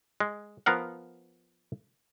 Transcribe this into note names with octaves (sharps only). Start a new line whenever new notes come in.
G#3
F3 B3 A#4 F5 F#5